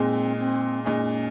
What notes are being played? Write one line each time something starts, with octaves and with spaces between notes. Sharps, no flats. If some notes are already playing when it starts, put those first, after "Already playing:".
Already playing: A#2 G#3 C4 D#4 G#4
C4
A#2 G#3 C#4 D#4 G#4